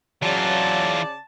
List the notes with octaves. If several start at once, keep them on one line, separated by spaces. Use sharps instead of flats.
C#3 E3 F#3 F4 D5 A5